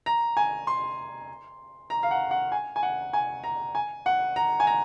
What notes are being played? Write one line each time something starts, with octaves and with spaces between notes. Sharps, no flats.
A#5
G#5
C6
A#5
F5
F#5
F#5
G#5
G#5
F#5
G#5
A#5
G#5
F#5
A#5
G#5
A#5